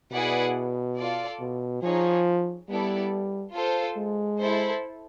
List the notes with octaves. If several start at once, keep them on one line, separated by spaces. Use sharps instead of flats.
B2 E4 G#4 B4 D5 F#5
F4 A4 D5
B2
F3 D#4 G#4 C#5
G3 B3 E4 A4 D5
F4 A4 C5
G#3
E4 A4 C5